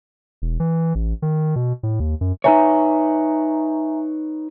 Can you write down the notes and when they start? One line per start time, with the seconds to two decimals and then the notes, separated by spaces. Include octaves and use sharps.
0.42 E1
0.60 E3
0.95 A1
1.22 D#3
1.56 B2
1.83 A2
2.00 D#2
2.21 F#2
2.44 D#4 B4 C#5 E5 G#5 A#5